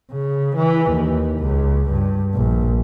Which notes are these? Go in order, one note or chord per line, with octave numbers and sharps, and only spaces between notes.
C#3
E3
D#2
C#2
G2
A#1